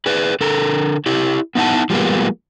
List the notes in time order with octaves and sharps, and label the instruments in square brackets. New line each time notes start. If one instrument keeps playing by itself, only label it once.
[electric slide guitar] G#4 B4 D5
D3 A4 A#4 A#5
E4 G4 D5
B3 D#4 E4 E5 F#5 A5
F3 G3 G#3 A#3 B3